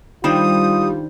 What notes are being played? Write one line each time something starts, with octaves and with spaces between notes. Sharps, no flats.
D#3 G3 D4 F4 C5 D#6